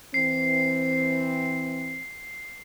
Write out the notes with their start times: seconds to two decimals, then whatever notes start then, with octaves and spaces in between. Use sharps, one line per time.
0.14 E3 C4 C7